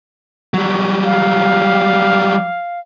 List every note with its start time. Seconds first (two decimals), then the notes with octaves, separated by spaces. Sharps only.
0.54 F#3 G3
1.05 F5